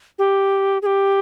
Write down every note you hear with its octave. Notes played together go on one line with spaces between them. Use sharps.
G4
G#4
G4